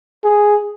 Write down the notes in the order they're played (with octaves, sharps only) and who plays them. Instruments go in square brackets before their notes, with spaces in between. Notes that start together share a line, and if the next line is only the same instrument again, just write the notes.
[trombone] G#4